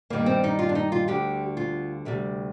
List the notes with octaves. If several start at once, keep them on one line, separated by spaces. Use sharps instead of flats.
G2 D#3 G3 A#3
C4
D#4
F4
D4
D#4
F4
D2 D3 G3 G4
F4
D2 C3 G3